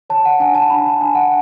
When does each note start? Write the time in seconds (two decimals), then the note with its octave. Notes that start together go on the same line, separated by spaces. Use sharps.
0.10 C#5 A5
0.25 F#5
0.40 D4 G#5
0.55 A5
0.70 D4 B5
0.86 A5
1.01 D4 G#5
1.15 F#5